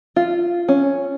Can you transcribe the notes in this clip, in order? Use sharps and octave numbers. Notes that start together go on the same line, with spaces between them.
F4
C#4